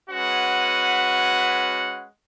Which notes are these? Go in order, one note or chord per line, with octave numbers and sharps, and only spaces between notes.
G#3 C#4 F#4 B4 F#5